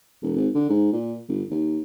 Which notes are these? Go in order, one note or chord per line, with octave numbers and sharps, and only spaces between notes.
E1
G#1
D3
G#2
A#2
G1
D#2